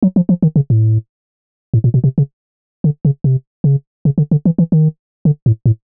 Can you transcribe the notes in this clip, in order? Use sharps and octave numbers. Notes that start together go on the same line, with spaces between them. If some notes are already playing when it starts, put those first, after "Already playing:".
F#3
F3
F3
D#3
C#3
A2
A2
A#2
B2
C3
C#3
D3
C#3
C3
C#3
C#3
D3
D3
E3
E3
D#3
D3
A2
A2